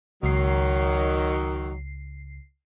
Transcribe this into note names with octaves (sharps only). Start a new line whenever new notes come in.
C#2 D#3 F#3 C7